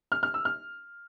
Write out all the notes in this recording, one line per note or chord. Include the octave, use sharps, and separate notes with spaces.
F6
F6
E6
F6